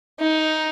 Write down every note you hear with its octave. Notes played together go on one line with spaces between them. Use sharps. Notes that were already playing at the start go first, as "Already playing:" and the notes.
D#4